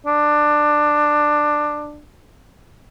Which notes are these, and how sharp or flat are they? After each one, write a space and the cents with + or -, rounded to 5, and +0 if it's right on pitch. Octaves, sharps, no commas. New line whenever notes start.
D4 +15